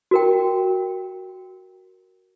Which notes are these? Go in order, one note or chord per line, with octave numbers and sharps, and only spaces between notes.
F#4 A#4 G5